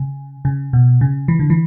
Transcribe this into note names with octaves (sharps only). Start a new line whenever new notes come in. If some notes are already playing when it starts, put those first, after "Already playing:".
Already playing: C#3
C#3
B2
C#3
E3
D3
E3